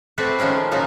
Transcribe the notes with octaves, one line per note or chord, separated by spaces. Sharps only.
A3 C4 F#4 B4 D5
D#3 F3 G#3 C#4 G5
A#2 C#3 F3 F#3 D#4